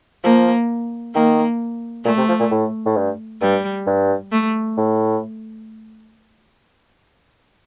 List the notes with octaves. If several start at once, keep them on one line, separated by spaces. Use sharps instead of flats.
F3 A#3
D#3 A#3
A#2 A3
C3
F3
A#2
A2
A2
G2
G2 G3
G2
A3
A2